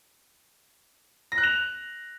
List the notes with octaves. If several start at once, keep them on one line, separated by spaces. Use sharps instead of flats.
A#6
F#6
F7